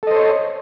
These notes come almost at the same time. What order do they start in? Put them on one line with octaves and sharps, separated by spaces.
A4 D#5 C5 C#5